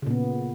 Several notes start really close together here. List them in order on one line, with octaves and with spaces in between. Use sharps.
C#3 A#2 B3